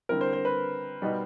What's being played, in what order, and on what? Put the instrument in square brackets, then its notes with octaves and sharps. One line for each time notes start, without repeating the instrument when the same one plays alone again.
[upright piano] D3 G3 C4 E4 [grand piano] A#4
[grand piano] C5
C5
B4
[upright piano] B2 G3 B3 D#4